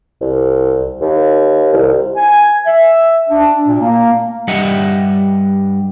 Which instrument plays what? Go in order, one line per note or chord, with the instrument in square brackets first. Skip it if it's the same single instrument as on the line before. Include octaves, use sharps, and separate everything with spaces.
[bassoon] C2
D#2
C2
[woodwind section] G#5
E5
D4
A#2
A#3
[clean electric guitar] G2 G3 D#5 E5 F#5